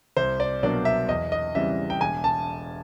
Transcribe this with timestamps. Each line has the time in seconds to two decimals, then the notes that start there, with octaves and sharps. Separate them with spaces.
0.17 C2 C5
0.40 D5
0.63 B2 F#3 A#3 D4 D5
0.85 E5
1.08 E2 D#5
1.32 D#5
1.55 C#3 E3 G3 C4 E5
1.90 G5
2.01 E1 G#5
2.24 A5